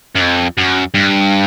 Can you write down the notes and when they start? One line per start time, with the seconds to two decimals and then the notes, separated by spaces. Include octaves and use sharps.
0.15 F#2
0.21 F2
0.57 F#2
0.94 G2